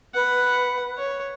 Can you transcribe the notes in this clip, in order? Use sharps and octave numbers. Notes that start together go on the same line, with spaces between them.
B4 F#5
C#5